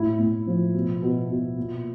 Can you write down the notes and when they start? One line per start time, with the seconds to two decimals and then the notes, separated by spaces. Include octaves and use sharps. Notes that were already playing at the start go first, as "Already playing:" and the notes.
Already playing: A2 E4
0.19 A2
0.47 F3
0.74 B2
1.02 B2
1.30 B2
1.57 A#2